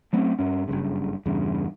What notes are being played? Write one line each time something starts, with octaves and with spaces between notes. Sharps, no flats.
F#3 A3 C4 C#4
G2 C#4
F#1 B1 G2 C#3
E2 G2 C#3